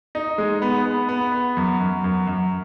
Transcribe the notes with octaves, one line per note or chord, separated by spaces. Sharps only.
D#4
G#3
B3
B3
B3
B3
F#2
F#2
F#2
F#2